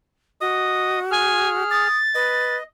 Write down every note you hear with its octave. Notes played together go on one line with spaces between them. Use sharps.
F#4 D#5 D#6
G#4 G#5 F6
D#6 A6
B4 D#5